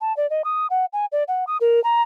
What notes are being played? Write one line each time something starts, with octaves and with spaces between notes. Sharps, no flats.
A5
D5
D#5
D#6
F#5
G#5
D5
F#5
D#6
A#4
A#5